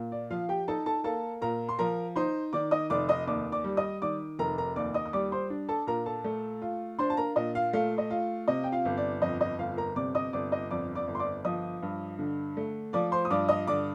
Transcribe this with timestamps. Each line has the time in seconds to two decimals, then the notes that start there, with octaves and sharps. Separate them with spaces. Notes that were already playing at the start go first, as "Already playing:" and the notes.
Already playing: A#2
0.12 D5
0.31 F3 F4 F5
0.49 G4 G5
0.68 D#4 A4 A5
0.86 A4 A5
1.04 A#3 A4 A5
1.41 A#2 A#4 A#5
1.69 C6
1.79 F3 A#4 A#5
2.16 D#4 C5 C6
2.53 D#3 D5 D6
2.71 D#5 D#6
2.90 F1 D5 D6
3.09 D#5 D#6
3.27 D#2 D5 D6
3.52 D5 D6
3.64 G3
3.77 D#5 D#6
4.02 D#3 D5 D6
4.39 F1 A#4 A#5
4.57 A#4 A#5
4.76 D#2 D5 D6
4.94 D#5 D#6
5.06 D#6
5.13 G3 D5 D6
5.32 C5 C6
5.50 D4
5.69 A4 A5
5.87 A#2 A#4 A#5
6.06 A4 A5
6.24 A3
6.62 F4
6.99 D4 C5 C6
7.10 A5
7.17 A#4 A#5
7.36 A#2 D#5
7.55 F4 F5
7.73 A3 F4 F5
7.98 D#5
8.10 F4
8.48 C3 D#5
8.64 G5
8.72 F4 F5
8.85 G1
8.97 D5
9.22 F2 D#5
9.41 D#5
9.59 G1 F4 F5
9.77 A#4 A#5
9.96 C3 D5 D6
10.15 D#5 D#6
10.33 G1 D5 D6
10.52 D#5 D#6
10.71 F2 D5 D6
10.95 D5 D6
11.07 G1
11.15 C6
11.19 D5 D6
11.45 F3 D#5 D#6
11.82 G2
12.19 D3
12.57 A3
12.93 F3 D5 D6
13.12 C5 C6
13.25 D#6
13.30 G2 D5 D6
13.49 D#5 D#6
13.67 D3 D5 D6